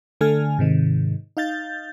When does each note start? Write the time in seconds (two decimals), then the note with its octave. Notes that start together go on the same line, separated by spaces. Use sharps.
0.21 D3 A3 A4 G#5 F6
0.59 G#2 C3 D#3
1.37 D#4 F5 G6 A6